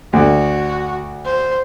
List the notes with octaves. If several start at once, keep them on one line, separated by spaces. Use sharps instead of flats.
D2 F#4
C5